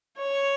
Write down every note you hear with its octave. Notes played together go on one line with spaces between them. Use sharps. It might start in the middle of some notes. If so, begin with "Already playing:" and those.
C#5